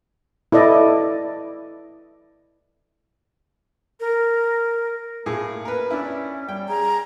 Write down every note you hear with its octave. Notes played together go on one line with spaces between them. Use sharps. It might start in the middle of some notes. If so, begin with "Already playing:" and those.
E4 A4 D5 D#5
A#4
A2 A#3 G#4
A#4 B4
C#4 D4 E4
G3 G5
G#4 A#5